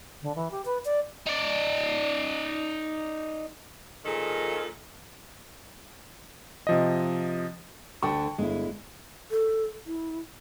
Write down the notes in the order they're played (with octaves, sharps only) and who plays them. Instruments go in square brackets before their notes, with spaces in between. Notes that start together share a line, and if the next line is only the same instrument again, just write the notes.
[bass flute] D3
E3
G4
B4
D5
[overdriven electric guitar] D#4 D5
[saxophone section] A#2 D#3 F3 G#4 A4
[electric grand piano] C3 F3 D#5
[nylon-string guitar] D2 D3 A4 [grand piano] G5 A5 C#6
[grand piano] G1 [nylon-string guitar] G#3 E4
[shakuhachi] A4
E4